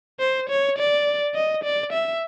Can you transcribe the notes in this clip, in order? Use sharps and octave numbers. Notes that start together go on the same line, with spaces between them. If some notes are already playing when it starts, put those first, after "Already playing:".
C5
C#5
D5
D#5
D5
E5